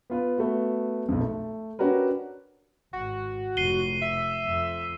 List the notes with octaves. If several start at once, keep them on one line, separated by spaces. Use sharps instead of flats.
B3 F4 B4
A3 B3 F#4
B1 F2
A3
C#4 D4 F#4 G4 A#4 B4
G#1 F#4
F1 C7 D#7 G7
E5
F2